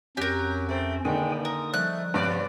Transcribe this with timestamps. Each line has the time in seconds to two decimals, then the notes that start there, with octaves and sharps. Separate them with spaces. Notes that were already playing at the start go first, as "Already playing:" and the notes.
0.17 F2 F#3 C#4 G4 A#4
0.69 A3 C4
1.05 D#2 D3 A#3 B3 D#4 G#4 G5 G#5
1.45 A#4 D#6
1.74 F3 G3 A3 F#6
2.14 G2 C3 B3 D5